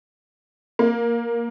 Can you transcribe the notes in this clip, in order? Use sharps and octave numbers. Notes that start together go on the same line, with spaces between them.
A#3